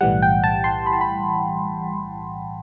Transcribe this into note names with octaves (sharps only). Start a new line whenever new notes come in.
B1 A2 E3 G3 F#5
G5
A5
C6
B5
A5
B5